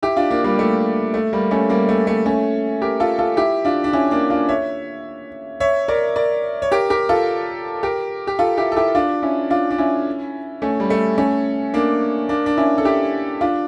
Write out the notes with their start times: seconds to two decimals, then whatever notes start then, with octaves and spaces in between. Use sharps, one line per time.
0.03 E4 G4
0.17 D4 F4
0.31 A#3 D4
0.44 G3 A#3
0.59 A3
1.14 A3
1.33 G3 A#3
1.51 A3 C#4
1.70 G3 A#3
1.89 A3
2.07 A3
2.26 A3 C#4
2.82 G4 A#4
3.00 F4 A4
3.19 F4 A4
3.37 E4 G4
3.65 D4 F4
3.84 D4
3.93 C#4 E4
4.11 A#3 D4
4.30 D4 F4
4.48 C#5 E5
5.60 C#5 E5
5.88 A#4 D5
6.16 A#4 D5
6.62 C#5
6.72 G4 A#4
6.90 G4 A#4
7.09 F4 A4
7.83 G4 A#4
8.27 G4
8.39 F4 A4
8.58 E4 G4
8.72 A4
8.76 E4 G4
8.95 D4 F4
9.23 C#4 E4
9.50 D4 F4
9.71 D4
9.78 C#4 E4
10.62 A3 C#4
10.80 G3
10.90 A3
11.18 A3 C#4
11.74 A#3 D4
12.29 A#3 D4
12.46 D4
12.57 C#4 E4
12.78 A4
12.85 E4 G4
13.41 D4 F4